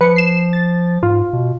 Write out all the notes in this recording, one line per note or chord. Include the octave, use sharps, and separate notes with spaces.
F3 B4 C#7
C7 E7
A6
G#2 F4
B2